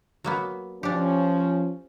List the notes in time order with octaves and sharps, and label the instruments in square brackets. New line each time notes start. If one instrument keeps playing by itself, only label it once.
[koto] F#3 A#3 B3
[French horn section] F3 C#4 [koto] D4 G4